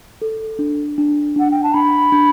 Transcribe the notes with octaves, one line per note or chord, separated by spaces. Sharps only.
A4
D4
D4
D4 F#5
G5
A5
D4 B5
D4